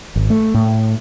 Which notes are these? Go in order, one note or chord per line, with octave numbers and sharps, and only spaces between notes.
G#1
A3
A2